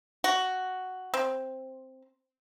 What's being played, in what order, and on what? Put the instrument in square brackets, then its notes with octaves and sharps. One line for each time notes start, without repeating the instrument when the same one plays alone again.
[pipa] F#4
C4